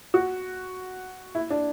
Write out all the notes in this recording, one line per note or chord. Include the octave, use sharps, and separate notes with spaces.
F#4
E4
D4